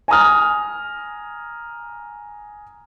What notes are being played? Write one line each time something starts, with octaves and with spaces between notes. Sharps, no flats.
G#5 A#5 D#6 F6